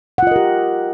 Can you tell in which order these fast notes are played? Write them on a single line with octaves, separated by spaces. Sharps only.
F#5 F4 D#5 A#4 G4